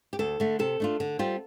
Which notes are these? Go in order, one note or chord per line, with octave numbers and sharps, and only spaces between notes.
G4
D2 A4
D3 A3
C3 A4
A3 D4 F4
D3
G3 C4 F4